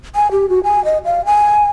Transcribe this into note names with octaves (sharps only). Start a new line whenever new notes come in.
G#5
G4
F#4
G#5
D#5
F5
G#5